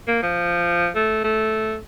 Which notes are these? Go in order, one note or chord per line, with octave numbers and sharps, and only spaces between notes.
A#3
F3
A3
A3